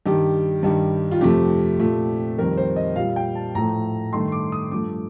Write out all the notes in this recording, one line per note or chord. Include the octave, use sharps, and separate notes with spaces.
G2 D#3 G3 G4
G2 D#3 G3
F4
F2 C3 F3 A3 G4
A#2 A3
F2 D#3 G3 A#4
C5
D#5
A#2 G3 F5
G5
A5
A2 F3 A3 A#5
G2 D#3 A3 C6
D6
D#6
G2 F3 A3 D6